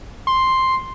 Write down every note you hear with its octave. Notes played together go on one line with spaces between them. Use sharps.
C6